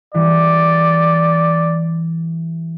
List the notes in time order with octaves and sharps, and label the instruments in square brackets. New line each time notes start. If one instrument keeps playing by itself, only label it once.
[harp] E3 G3 [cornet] D5